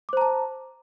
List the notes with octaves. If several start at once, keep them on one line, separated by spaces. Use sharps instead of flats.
C5 A5 A#5 D6